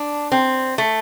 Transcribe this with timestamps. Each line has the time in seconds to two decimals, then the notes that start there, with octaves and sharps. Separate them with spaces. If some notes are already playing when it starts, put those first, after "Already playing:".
Already playing: D4
0.32 C4
0.78 A3